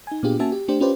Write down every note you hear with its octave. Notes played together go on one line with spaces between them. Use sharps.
D#4 G#5
A#2 B3 D4 F4 G4 G#4
A#3 C#4 F#4 E5 G#5 A5
G4
A3 D4 G4 C5
C#4 F4 G4 B4 C5 D5